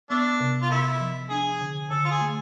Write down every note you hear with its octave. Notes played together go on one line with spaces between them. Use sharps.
A3 B3 D4
C3
F4
C3 A3 E4
F3
D4 G#4
D3
D3 A4
F4
G#4
A3